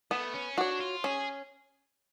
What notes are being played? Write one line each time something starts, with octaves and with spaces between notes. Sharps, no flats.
A3 B3
C#4
D4 F#4 C#5
F4
C#4 G#4